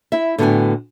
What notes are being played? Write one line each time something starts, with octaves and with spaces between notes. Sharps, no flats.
E4 E5
A2 D3 B3 F#4 G5 G#5